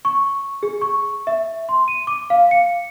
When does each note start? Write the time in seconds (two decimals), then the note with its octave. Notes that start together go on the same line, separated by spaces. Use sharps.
0.05 C#6
0.63 G#4
0.81 C#6
1.27 E5
1.69 C6
1.88 D#7
2.07 D6
2.30 F5
2.51 C#7